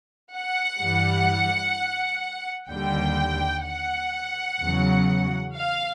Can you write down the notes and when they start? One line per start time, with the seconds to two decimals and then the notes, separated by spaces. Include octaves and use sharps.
0.34 F#5
0.81 G2 E3 G3
2.70 D#2 D3 G3 G5
3.66 F#5
4.60 E2 C#3 F#3
5.55 F5